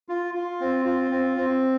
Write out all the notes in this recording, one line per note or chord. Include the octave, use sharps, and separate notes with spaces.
F4
F4
C4
F4
C4
C4